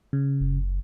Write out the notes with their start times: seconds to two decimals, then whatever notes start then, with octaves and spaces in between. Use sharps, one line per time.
0.13 C#3
0.40 F#1